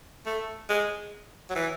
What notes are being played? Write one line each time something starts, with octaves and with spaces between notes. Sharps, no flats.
A3
G#3
F#3
E3